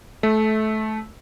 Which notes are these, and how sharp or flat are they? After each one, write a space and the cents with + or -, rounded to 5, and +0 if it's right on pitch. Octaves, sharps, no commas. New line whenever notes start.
A3 -20